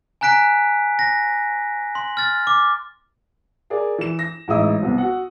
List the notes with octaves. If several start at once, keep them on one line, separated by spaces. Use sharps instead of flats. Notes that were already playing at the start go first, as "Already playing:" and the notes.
G#5 A#5 F#6 B6 D7
A#6
C6
F6 A6
D6
G#4 A#4 D5
E3 E7
A#6
A1 G#2 E4 D#5 D#6 E6
C2 B3
F#4 F#5